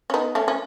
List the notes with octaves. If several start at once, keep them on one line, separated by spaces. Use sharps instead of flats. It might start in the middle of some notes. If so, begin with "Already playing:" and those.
C#4
B3 D#4
A3 C#4
C#4